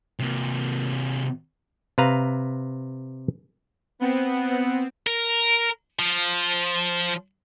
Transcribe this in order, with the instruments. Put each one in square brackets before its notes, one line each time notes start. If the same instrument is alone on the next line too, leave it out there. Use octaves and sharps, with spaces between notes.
[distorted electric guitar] C3 A#3
[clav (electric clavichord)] C3 B4 F5 A#5
[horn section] B3 [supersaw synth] C4
[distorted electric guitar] A#4
F3